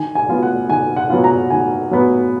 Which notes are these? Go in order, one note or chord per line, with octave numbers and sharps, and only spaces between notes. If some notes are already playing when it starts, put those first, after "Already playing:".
Already playing: D#3 G#5
G#5
F#3 B3 F4
F#5
D#3 G#5
F#5
F#3 B3 F4
A#5
D#3 G#5
F#3 B3